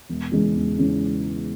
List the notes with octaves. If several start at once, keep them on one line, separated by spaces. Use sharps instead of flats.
E1
E2 C#3 E3 G#3
E1
C#3 E3 G#3